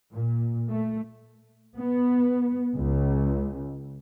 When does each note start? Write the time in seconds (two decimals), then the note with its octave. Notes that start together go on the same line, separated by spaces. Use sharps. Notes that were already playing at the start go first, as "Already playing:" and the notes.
0.13 A#2
0.69 A3
1.78 B3
2.74 C#2